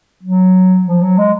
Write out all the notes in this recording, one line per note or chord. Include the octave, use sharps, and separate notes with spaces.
F#3
F3
F#3
G#3